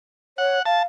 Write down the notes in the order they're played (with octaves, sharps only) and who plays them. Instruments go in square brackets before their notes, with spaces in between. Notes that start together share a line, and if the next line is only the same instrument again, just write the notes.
[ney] C#5 [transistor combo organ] F#5
[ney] F5 [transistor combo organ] A5